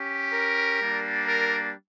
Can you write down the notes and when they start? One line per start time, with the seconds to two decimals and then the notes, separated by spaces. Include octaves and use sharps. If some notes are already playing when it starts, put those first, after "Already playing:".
Already playing: C#4 G4
0.34 A#4
0.81 G3 A#3 D4
1.26 A#4